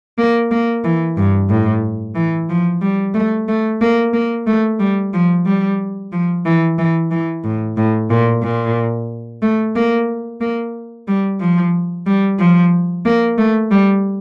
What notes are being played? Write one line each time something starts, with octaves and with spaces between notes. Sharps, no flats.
A#3
A#3
E3
G2
A2
E3
F3
G3
A3
A3
A#3
A#3
A3
G3
F3
G3
F3
E3
E3
E3
A2
A2
A#2
A#2
A3
A#3
A#3
G3
F3
G3
F3
A#3
A3
G3